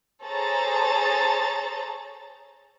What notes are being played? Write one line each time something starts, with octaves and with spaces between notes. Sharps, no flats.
G#4 A4 C5 C#5 A#5 A6